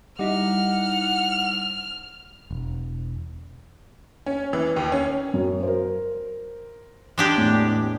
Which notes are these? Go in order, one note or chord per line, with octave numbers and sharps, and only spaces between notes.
G3 D#4 E4 F#5 F6
E1
C#4
E3
D#2
C#4
F#2
A#4 C5
G#3 D4 G4
E2 A2